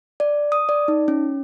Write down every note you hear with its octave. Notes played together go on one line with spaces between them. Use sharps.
D5
D#6
D5
D#4
C#4